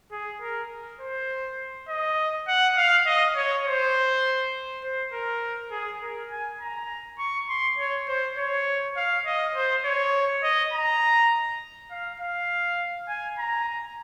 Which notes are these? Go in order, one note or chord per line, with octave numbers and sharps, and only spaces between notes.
G#4
A#4
C5
D#5
F#5
F5
D#5
C#5
C5
C5
A#4
G#4
A#4
G#5
A#5
C#6
C6
C#5
C5
C#5
F5
D#5
C5
C#5
D#5
A#5
F5
F5
G#5
A#5